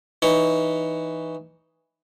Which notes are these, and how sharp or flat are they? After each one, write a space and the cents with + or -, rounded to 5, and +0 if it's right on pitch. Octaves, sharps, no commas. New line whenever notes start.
E3 +0 D#4 +0 C#5 +10